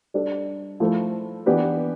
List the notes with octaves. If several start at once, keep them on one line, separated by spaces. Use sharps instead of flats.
G3 D4 A4
F3 A3 E4 A4
E3 B3 D4 G4 B4